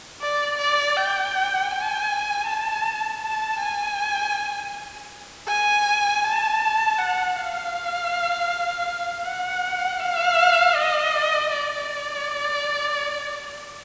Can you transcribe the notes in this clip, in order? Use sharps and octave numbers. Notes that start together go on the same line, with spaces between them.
D5
D5
G5
G#5
A5
A5
G#5
G#5
A5
F#5
F5
F#5
F5
D#5
D5